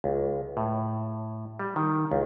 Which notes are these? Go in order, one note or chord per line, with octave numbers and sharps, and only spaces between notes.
C#2
A2
G3
D#3
C#2